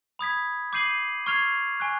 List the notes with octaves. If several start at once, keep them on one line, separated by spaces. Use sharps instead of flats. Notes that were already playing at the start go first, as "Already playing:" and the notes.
B5 D#6 G#6 B6
D6 G6 C7 D#7 F#7
C#6 F6 G#6 C7 F7
G#5 C#6 F#6